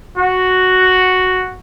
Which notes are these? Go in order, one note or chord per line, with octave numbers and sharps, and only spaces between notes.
F#4